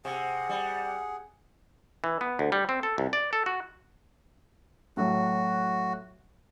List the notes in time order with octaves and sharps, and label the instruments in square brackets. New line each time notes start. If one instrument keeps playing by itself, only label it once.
[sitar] C3 [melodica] G#4 [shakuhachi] F#5
[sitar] G3
[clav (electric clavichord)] E3
B3
D2
G3
C4
A4
C2
D5
A4
F#4
[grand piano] A2 F#3 [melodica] F#4